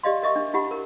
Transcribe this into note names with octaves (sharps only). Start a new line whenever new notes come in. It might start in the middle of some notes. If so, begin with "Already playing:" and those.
G4 D5 D#5 F5 C6
A#4 D#5 E5 C#6 D6
D4
E4 G4 F#5 B5
A#4